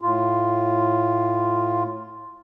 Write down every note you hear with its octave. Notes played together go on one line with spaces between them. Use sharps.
A2 F4